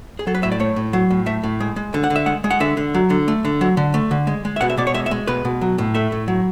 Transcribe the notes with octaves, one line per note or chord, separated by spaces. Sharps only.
G#4
F#3 A4
B4
A2 E5
D5
A3 C#5
A2
F#3
A2
A3 E5
A2
G#3
G#3
D3
F#5
D3
E5
G#3 F#5
G#3
F#5
D3 E5
D3
F#3
D3
A3
D3
F#3
D3
A3
D3
G#3
G#3
E5
B2 F#5
E5
B2 D5
C#5
G#3 E5
E5
G#3
B2 B4
B2
F#3
A2
A3 E5
A2
F#3